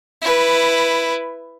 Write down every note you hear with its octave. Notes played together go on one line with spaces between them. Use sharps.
E4 B4